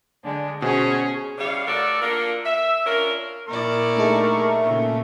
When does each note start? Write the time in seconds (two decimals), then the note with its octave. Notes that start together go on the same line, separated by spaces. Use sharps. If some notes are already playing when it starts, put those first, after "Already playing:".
0.23 D3 G#3 D4
0.62 B2 C#4 G#4 C5 C#5
1.38 C#3 G3 E4 C#5 D5 F5
1.67 A3 F#4 A4 A#4 D5
2.02 A#3 D4 F4 A4 A#4
2.46 E5
2.86 C#4 D4 F4 A#4
3.48 A#2 E4 A#4 D5 C#6
3.97 A3 D4 D#4 G#4
4.61 A#2 C#3